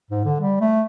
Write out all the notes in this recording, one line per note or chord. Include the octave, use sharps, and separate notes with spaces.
G#2
D3
G3
A3